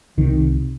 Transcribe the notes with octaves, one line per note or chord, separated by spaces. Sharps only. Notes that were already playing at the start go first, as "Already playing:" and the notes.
C2 C3 D#3